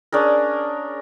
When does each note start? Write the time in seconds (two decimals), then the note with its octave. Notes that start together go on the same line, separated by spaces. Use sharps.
0.12 C#4 D4 G#4 A#4